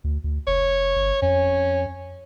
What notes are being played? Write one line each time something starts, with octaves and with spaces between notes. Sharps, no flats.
D2
D2
F1 C#5
G1
F2 C#4